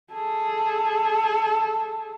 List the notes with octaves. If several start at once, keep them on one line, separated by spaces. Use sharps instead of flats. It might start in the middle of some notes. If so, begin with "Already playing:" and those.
G#4 A4